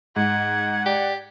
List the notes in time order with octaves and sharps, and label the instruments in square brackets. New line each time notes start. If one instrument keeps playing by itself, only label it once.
[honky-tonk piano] G#2 [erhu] F#5 [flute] G#6
[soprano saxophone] G4 [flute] D5